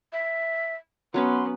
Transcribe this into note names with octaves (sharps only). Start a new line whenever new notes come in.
E5
F#3 B3 C#4 B4 C6